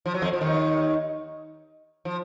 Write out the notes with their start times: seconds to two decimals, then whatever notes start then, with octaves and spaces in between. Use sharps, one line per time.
0.06 F3
0.14 F#3
0.22 F2 F3
0.33 F3
0.41 D#2 D#3
2.05 F3